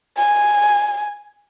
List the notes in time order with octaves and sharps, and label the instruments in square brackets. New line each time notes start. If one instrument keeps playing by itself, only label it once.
[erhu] G#5